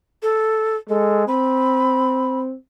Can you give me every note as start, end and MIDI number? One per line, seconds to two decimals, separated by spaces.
0.23 0.76 69
0.89 1.24 56
0.89 1.23 69
1.28 2.54 60
1.28 2.39 83